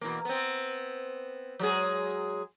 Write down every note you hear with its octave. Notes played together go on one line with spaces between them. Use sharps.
B2 E3 A#3
B3 C4
F#3 G#3 G#4